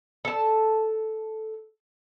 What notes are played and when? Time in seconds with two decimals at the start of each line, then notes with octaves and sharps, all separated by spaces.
0.25 A4 A5